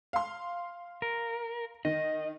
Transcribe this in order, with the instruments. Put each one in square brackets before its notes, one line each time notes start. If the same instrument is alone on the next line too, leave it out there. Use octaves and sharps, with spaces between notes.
[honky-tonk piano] F5 C6
[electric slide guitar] A#4
[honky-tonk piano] D#3 [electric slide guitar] D#5